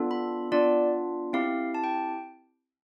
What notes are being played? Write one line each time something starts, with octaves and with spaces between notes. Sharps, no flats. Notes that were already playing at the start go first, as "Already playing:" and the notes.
Already playing: B3 D4 F4 A4
B5
B3 D4 F4 D5
C4 E4 G4 F5
A5
G5